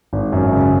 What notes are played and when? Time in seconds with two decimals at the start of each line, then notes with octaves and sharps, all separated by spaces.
0.13 G#1
0.32 F#2
0.52 C#3